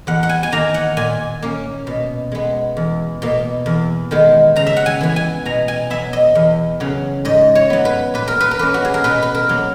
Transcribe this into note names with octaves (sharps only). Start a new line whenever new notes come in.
E2 F#5
F#5
G#5
G#5
D#3 A#3 A#5
F#5
A#2 G#5
A#3 C#4
B2
G#3 B3
E2
B2 A#3
E2
D#3 G#3 B3
C#3 A#5
E5
F#5
G#5
E3 B3
G#5
B2 A#5
G#5
F#3 B3 E5
D#5
E2
C#3 F#3 C#4
G#2 D#5
C#5
F#3 B3
B4
A#2 B4
A#4
B4
A#4
A#3 C#4 B4
F#4
G#4
A#4
B2 B4
B4
A#4
F#3 A#3